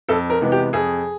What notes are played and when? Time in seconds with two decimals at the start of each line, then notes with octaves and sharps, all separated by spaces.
0.09 F2 A4
0.30 A#4
0.41 C3 E3 G#3 B3
0.52 G4
0.73 F2 G#4